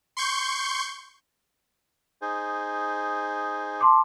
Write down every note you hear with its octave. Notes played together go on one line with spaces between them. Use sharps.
C6 C#6 G6
D#4 G#4 C5
A5 C6 D6